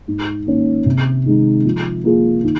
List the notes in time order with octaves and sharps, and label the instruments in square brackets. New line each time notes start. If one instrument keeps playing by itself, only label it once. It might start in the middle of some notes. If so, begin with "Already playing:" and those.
[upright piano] G#2
D#3 A#3 C#4
C3
D#3 G#3 D#4
F3
A#3 F4 G#4
D#3